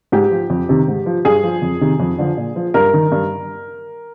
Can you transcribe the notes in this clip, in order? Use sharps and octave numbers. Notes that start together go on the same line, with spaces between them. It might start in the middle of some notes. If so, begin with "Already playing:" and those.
G#2 G4
F3
F2
C3 D#3
G#2
F3
G2 G#4
F3
F2
C3 D#3
F2
D3 F3
A#2
F3
G2 A#4
D#3
G2